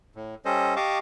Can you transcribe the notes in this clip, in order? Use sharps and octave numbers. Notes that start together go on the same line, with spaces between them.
A2
G3 C#4 A4 C5 D#5
G4 D#5 F5 A5 C#6 D6